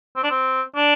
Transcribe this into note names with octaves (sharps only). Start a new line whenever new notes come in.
C4
D4
C4
D4